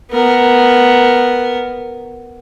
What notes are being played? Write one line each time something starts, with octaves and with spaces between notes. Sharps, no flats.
B3 A#4